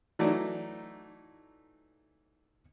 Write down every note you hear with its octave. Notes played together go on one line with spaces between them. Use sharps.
E3 F#3 A3 D#4 D5